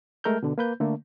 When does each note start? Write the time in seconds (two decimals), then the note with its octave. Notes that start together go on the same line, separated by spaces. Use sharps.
0.24 G#3 A3 A#4 F6 G6
0.43 B2 D3
0.58 A#3 B4 G6
0.80 D3 A3 A#3